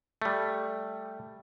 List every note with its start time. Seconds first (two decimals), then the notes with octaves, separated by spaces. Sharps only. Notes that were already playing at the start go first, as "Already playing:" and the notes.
0.22 G3 A3